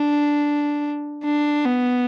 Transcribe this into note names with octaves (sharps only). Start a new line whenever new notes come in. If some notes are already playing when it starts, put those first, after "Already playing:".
Already playing: D4
D4
B3